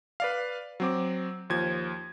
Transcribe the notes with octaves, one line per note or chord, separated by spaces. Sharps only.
B4 D5 F5
F#3 C4 D6
D#2 F3 G#6